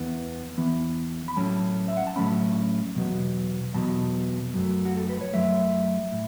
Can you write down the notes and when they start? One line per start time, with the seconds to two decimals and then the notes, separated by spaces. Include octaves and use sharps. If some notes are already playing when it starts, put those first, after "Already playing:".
Already playing: E2 E3 B3
0.58 E2 E3 B3
1.28 B5
1.37 A2 F#3 A3 C#4 A5
1.88 E5
1.97 F#5
2.07 A5
2.16 A2 F#3 A3 C#4 B5
2.95 E2 B2 F#3 B3
3.74 E2 B2 F#3 B3 A5
4.54 F#2 F#3 A3
4.85 F#4
4.97 A4
5.09 B4
5.21 C#5
5.33 F#2 F#3 A3 E5
6.12 A2